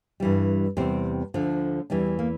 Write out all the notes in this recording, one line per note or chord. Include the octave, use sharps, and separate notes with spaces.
G2 E3 G3
E2 C3 G3 C4
D2 D3 F3
E2 E3 G3 D4
A#3